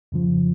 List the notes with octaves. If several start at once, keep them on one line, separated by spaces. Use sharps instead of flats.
F2 C#3 F3